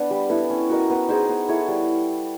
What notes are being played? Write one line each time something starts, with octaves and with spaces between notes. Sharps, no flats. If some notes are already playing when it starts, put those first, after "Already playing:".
Already playing: B3 D4
G3
B3 E4 A4
C#4
F#4 A#4 D#5
B3
D#4 G#4 C5
B3
E4 A4 C#5
G3